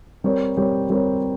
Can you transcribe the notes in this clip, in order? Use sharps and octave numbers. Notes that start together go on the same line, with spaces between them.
G3 C4 G4 A#4 C#5
G3 C4 G4 A#4 C#5
G3 C4 G4 A#4 C#5